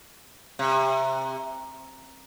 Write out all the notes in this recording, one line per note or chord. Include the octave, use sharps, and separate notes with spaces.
C3